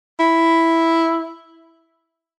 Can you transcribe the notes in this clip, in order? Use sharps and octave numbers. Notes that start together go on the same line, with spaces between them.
E4